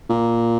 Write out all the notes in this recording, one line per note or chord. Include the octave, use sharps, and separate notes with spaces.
A#2